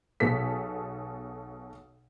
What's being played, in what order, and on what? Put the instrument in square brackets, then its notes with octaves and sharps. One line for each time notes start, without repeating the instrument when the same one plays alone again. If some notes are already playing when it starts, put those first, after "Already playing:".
[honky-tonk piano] B1 B2 G#4 A4 B6